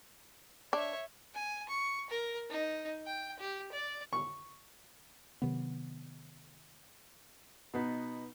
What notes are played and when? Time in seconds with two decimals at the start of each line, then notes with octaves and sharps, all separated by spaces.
0.73 D4 C#5 E5
1.34 G#5
1.69 C#6
2.10 A#4
2.50 D#4
3.06 G5
3.39 G4
3.72 D5
4.13 C#6
5.42 C3 D#3 F#3 B3
7.74 B2 B3 D#4